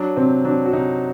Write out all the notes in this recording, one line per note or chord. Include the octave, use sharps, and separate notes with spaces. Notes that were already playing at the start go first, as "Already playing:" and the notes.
Already playing: F#3 D4
C3 C4
F#3 D4
F#4
C3 D#4